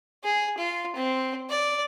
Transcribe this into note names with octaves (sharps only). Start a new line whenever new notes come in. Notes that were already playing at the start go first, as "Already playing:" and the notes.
G#4
F4
C4
D5